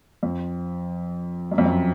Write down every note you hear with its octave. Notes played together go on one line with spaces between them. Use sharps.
F2
F#2
F2
F#2